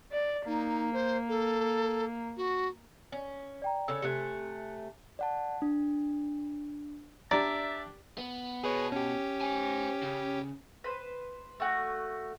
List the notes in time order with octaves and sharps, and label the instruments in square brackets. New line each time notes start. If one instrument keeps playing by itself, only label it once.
[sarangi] D5
[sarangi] A#3 [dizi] D#4
[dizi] C5
A4
F#4
[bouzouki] C#4
[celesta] D5 G5 A#5
[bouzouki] C#3 A4 C#5 [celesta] E6
[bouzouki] C3 A3 G#5 [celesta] F#6 C#7
[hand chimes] D5 F#5 A5
D4
[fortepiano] D4 G4 [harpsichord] D5 [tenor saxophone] E5 [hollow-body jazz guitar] A#5
[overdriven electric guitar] B3
[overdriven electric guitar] B2 [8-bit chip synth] G#4 B4 C#5
[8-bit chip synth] C#4 G4
[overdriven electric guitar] C5 G#5
C#3
[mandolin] B4 C5
A3 F#4